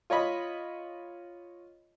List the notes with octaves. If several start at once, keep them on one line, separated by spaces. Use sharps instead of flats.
F4 C#5 D#5 B5